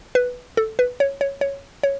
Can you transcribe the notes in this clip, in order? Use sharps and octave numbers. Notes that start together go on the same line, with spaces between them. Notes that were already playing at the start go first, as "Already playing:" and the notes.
B4
A4
B4
C#5
C#5
C#5
C#5